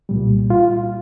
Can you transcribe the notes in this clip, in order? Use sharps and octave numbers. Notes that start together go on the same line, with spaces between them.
C2 A#2 G3
F4